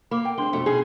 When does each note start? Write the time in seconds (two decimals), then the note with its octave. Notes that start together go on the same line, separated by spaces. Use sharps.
0.11 A#3 B5 D6
0.25 G5
0.38 G#3 C4 D4 C6 G7
0.53 F2 B2 A3
0.66 B2 D#4 G#4 G#5